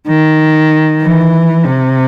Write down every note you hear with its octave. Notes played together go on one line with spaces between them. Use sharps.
D#3
E3
C3